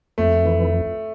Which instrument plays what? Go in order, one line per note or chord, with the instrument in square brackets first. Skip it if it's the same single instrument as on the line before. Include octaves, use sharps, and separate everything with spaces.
[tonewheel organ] F2 [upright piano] A3
[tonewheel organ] E3